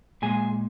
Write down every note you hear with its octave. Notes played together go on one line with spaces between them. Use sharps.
A#2 G#3 G#4 G#5